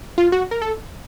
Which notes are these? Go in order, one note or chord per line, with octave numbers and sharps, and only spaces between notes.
F4
F#4
A#4
A4